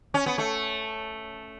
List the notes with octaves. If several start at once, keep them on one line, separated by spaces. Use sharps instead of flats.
C#4
B3
A3